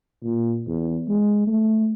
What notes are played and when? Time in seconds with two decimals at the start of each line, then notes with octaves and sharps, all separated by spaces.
0.23 A#2
0.67 E2
1.09 G#3
1.47 A3